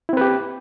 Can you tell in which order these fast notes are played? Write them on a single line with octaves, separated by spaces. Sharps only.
E4 C4 B4 G4